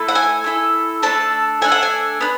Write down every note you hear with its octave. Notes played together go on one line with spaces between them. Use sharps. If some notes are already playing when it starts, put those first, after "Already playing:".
Already playing: A3 E4 A4
F#5
G#5
A3 E4 A4
A3 D4 A4 A5
A3 D4 A4 G#5
F#5
G#5
B3 D4